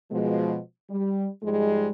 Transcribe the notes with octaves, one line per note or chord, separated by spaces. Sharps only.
B2 F3 G#3
G3
G#2 F3 G3 G#3